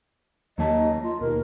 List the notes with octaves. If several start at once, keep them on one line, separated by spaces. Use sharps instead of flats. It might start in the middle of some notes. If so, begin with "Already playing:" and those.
D#2 F#3 A#3 D#5 A5
F4
D#2 B2 A#4